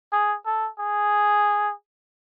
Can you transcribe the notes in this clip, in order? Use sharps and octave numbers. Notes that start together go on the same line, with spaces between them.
G#4
A4
G#4